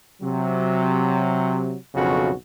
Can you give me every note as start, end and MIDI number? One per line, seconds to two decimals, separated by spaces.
0.22 1.76 48
0.22 1.76 54
1.94 2.32 35
1.94 2.32 41
1.94 2.32 49
1.94 2.32 66